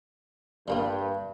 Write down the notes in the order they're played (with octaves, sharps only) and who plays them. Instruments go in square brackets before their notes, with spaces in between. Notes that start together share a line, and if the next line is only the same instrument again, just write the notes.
[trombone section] G2 [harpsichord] G3 A#3 F4